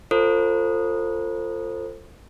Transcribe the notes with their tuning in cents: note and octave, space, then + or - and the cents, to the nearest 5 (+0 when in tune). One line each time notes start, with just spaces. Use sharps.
F4 +0 A4 +35 C5 +15